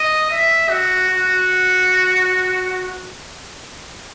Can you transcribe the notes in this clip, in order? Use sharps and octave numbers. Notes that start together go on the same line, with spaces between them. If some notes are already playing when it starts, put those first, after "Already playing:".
Already playing: D#5
E5
F#4
F#4